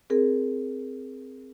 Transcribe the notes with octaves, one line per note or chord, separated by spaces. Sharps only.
C4 G#4 A#4